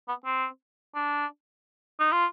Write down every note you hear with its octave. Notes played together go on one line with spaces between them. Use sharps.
B3
C4
D4
D#4
F4